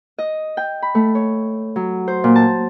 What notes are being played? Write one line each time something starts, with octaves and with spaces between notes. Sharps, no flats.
D#5
G5
B5
A3
C#5
F#3
C5
A#2
A5